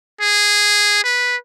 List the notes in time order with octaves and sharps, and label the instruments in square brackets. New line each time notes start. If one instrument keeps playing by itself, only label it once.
[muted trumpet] G#4
B4